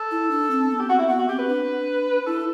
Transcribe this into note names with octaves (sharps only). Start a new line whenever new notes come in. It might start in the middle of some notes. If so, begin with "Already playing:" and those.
Already playing: A4
E4
D4
C4
B3
G4
C4 F#4
E4
B3 F#4
F#4
C4 G4
B4
D4
E4 A4